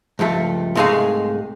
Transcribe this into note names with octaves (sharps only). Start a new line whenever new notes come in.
C#2 G2 F3 A3
C2 G#2 G#3 A3 F5 G#5